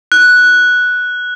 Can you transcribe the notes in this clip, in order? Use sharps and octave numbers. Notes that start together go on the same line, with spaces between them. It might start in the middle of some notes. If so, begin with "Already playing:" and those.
F#6